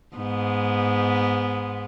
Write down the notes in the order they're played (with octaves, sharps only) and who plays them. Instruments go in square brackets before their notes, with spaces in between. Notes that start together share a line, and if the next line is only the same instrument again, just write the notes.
[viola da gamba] G#2 B3